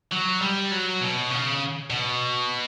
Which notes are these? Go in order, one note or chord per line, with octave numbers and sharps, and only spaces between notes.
F#3
G3
F#3
B2
C#3
B2